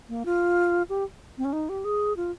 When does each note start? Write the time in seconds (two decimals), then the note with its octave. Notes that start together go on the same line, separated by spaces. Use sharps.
0.09 A#3
0.25 F4
0.89 G4
1.38 C4
1.44 C#4
1.53 D#4
1.69 G4
1.84 G#4
2.16 F4